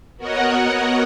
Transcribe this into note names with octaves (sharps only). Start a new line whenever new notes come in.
B3 F#4 A#4 C#5 D#5 F#5